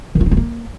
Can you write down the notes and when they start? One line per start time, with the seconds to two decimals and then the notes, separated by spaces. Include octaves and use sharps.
0.15 D#3
0.21 F4
0.26 D#4
0.31 A3
0.37 A#3